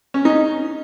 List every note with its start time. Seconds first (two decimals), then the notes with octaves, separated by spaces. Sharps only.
0.14 C#4
0.25 D#4